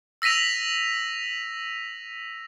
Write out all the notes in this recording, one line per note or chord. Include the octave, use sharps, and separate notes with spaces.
E6 A#6 B6 D#7 F7